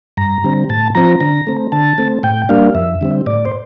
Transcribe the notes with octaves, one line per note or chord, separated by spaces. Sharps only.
G2 A#5
D3 G3 C4
A2 A5
F3 C4 A#5
D3 A#5
A3 C4
D3 A5
A3 C4
A2 G5
G3 A#3 D4 F5
F2 E5
D3 G3 C4
A2 D5
C5